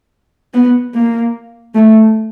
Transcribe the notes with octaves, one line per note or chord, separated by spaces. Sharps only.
B3
A#3
A3